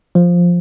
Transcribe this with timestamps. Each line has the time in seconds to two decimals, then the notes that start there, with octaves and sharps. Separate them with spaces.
0.15 F3